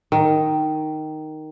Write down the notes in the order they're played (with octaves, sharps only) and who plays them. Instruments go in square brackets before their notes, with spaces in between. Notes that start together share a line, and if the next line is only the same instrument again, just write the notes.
[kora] D#3